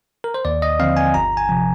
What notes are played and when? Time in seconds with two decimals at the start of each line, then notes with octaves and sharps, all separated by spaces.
0.24 A#4
0.34 C5
0.45 D#2 D5
0.62 D#5
0.79 D3 F3 C4 F5
0.97 G#5
1.14 G1 A#5
1.37 G#5
1.49 C3 F3